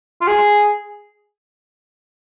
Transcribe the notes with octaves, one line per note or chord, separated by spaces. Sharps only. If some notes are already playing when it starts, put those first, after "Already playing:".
F4
G#4